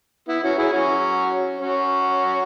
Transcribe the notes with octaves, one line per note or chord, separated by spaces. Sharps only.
B3 E4
C#4 F#4
E4 G#4
C#4 F#4
C#4 F#4